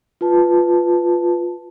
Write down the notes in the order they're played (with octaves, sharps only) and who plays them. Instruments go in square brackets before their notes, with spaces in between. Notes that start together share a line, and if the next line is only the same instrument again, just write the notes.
[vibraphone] F4 B4 A5